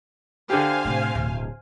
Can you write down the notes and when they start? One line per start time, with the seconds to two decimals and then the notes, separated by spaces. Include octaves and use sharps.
0.50 D3 G4 C5 F5 G#5
0.85 A2 C3
1.15 D1 B1